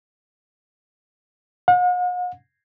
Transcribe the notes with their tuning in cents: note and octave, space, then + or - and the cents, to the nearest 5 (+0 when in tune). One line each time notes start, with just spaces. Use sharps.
F#5 -45